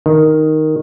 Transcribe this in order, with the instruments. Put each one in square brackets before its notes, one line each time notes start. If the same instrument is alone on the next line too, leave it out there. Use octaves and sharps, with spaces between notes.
[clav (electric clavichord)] D#3